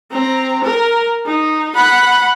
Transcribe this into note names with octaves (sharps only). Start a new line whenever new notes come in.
C4 A#5
A#4
D#4
F#5 B5